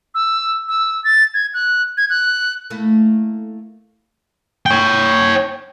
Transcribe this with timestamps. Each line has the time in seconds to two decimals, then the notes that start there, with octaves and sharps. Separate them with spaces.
0.15 E6
0.69 E6
1.04 A6
1.34 G#6
1.54 F#6
1.97 G#6
2.10 F#6
2.70 A3 A#3 E4
4.66 C#5 G5